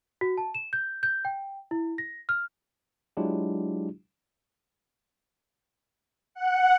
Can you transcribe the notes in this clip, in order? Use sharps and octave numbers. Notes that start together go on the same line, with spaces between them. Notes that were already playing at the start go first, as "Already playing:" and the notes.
F#4
A5
E7
G6
G6
G5
E4
A#6
F6
F#3 G#3 D4 E4 F4 G4
F#5